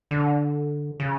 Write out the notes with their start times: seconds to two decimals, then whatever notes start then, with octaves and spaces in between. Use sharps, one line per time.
0.11 D3
1.00 C#3